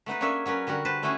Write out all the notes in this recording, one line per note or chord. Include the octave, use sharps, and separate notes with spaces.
A3 B3 D#4 B4
A#3 C#4 D4 G#4 C#5 E5
F#3 C#4 A#4 B4
D3 G3 F#4 A#4
B4 C5 A5
A3 C#4 E4 F#4 G#4